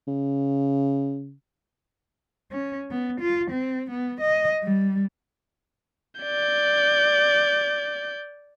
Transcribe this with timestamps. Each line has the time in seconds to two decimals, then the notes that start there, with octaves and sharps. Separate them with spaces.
0.07 C#3
2.51 C#4
2.91 B3
3.21 F4
3.51 C4
3.90 B3
4.21 D#5
4.63 G3
6.21 D5 G6